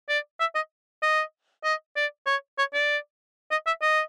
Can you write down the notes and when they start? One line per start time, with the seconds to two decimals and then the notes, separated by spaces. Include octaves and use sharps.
0.09 D5
0.40 E5
0.55 D#5
1.03 D#5
1.64 D#5
1.96 D5
2.26 C#5
2.58 C#5
2.74 D5
3.51 D#5
3.67 E5
3.82 D#5